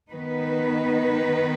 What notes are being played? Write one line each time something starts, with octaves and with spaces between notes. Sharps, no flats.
D#3 B3 D#4 B4